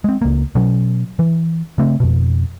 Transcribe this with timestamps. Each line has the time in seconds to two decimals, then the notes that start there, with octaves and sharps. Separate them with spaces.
0.04 G#3 C4
0.22 C#2 A#3
0.55 B2 F#3 C#4
1.19 E3
1.78 C#3 A3 C4
2.00 F2 B2